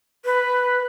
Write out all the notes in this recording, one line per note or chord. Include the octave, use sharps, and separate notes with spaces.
B4